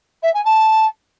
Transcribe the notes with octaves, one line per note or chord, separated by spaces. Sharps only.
E5
G#5
A5